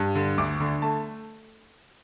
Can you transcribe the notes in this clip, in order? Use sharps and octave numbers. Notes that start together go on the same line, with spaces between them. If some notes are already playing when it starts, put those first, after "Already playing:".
Already playing: G2
D3
D2 D6
D3
A3 A5